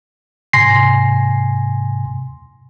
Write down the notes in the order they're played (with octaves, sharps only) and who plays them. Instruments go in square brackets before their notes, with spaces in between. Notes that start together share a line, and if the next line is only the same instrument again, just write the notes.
[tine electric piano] G#2 C3 G#5 C6 A#6 C7